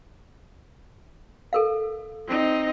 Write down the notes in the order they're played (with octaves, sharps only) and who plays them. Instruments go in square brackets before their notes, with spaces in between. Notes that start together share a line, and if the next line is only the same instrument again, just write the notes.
[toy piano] A4 A#4 F5
[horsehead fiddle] C4 D#4